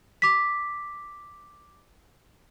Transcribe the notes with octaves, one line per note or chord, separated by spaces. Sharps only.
D6 B6